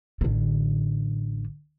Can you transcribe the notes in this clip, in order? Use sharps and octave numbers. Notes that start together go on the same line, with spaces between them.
A1 D3